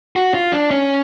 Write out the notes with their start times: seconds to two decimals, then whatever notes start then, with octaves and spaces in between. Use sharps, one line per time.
0.16 F#4
0.34 F4
0.52 D4
0.71 C#4